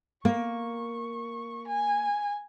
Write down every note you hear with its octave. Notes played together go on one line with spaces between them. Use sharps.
A#3 C#6
G#5